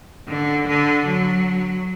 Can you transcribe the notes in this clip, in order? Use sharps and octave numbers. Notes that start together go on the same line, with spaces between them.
D3
D3
F#3